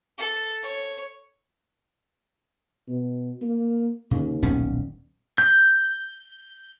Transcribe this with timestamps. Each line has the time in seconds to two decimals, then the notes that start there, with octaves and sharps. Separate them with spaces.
0.18 A4
0.63 C#5
2.88 B2
3.41 A#3
4.11 D#2 C#3
4.42 D#1 B1 C#4
5.38 G6